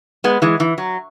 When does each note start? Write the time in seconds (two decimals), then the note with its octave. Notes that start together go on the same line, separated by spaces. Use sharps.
0.24 G#3 B3
0.42 E3 G#3
0.60 E3
0.78 F#3